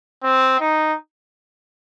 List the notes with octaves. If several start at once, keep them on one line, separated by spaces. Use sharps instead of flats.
C4
D#4